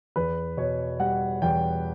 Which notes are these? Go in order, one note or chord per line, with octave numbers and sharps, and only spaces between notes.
E2 B4
B2 C#5
G3 F#5
E2 G5